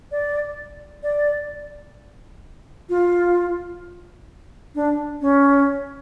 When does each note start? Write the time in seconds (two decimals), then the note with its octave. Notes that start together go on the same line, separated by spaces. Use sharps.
0.11 D5
1.03 D5
2.89 F4
4.75 D4
5.21 C#4